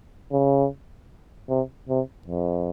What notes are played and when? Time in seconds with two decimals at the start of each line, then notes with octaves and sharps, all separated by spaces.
0.32 C#3
1.49 C3
1.89 C3
2.28 F2